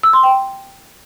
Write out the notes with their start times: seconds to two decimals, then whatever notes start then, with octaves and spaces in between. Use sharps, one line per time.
0.03 E6
0.13 C6
0.23 G5